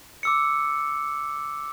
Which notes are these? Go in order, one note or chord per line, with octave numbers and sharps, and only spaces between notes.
D6 E6 C#7